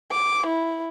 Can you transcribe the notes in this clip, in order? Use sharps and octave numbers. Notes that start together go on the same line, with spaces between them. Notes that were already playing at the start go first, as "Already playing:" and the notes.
D6
E4